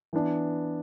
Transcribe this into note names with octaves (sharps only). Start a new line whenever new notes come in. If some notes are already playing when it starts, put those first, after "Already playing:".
E3 B3 D4